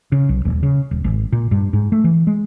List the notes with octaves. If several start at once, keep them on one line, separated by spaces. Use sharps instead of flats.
C#3
B1
D#1
C#3
D#1
G#1
A#2
G2
G#2
A3
E3
G#3